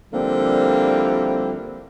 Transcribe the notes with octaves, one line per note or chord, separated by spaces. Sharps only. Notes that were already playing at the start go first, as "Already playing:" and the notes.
D3 F3 G3 A#3 C4 E4